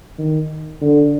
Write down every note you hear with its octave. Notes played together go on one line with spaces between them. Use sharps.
D#3
D3